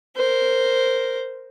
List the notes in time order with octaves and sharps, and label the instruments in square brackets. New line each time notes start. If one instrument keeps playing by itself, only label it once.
[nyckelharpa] A#4 C5